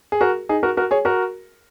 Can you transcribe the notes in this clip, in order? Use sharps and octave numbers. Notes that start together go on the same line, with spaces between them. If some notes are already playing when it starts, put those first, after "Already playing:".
G#4
F#4 A#4
D#4 G#4
F#4 A#4
F#4 A#4
G#4 C#5
F#4 A#4